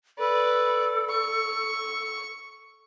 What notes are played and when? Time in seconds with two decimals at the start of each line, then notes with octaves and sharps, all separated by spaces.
0.18 A4 B4 D5
1.09 C#6